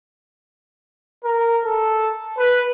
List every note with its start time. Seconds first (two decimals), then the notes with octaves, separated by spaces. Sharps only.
1.24 A#4
1.65 A4
2.38 B4